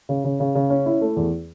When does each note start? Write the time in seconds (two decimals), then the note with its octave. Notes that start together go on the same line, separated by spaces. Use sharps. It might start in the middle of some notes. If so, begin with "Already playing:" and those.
0.09 C#3
0.24 C#3
0.40 C#3
0.55 C#3
0.70 C#4
0.86 E4
1.01 A3
1.16 E2